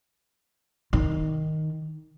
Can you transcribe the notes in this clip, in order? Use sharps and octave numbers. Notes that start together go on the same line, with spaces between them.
D#3